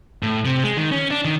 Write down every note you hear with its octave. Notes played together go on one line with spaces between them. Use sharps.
A2
C3
G#3
D#3
C#4
D4
D#3